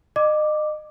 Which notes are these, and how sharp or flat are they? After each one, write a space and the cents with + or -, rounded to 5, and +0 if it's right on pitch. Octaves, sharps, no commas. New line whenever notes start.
D#5 -30 D6 +0